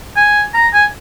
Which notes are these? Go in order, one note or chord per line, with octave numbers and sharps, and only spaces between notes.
G#5
A#5
G#5